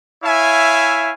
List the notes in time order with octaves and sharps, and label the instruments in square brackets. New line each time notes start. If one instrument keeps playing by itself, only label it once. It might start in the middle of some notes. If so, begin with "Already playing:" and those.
[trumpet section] E4 C#5 E5 F5 G#5